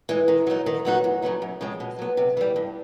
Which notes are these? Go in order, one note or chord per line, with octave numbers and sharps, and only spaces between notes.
E3 G#3
D#3
F#3 B3 D#4
D#3
F#3 B3 D#4 F#4
E2
C#3 F#3 B3 D#4
F#2
C#3 F3 G#3 C4
B2
F#3 B3
C3
E3 G3
G2